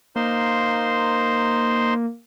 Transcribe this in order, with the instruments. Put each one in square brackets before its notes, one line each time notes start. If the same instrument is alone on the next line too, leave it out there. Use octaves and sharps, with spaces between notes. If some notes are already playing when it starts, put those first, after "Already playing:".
[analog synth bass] A#3 [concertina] D#4 C5 C6